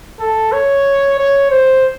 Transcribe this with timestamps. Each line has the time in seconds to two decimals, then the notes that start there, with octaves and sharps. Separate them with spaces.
0.19 A4
0.52 C#5
1.18 C#5
1.51 C5